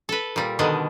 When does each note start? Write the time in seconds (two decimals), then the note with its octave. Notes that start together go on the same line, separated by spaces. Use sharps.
0.09 A4 B4
0.36 A#2 G3
0.59 B2 D3 D#3 D4